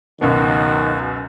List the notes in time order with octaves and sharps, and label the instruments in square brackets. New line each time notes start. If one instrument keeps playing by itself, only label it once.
[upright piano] C#2 F#2 B2 [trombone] D#3 [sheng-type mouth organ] F#4